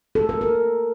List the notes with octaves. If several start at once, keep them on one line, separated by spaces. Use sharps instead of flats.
A4
A#4
A#4